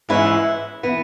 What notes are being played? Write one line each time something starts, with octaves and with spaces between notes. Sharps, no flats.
G#2 E3 G#3 C#4 E4
E3 B3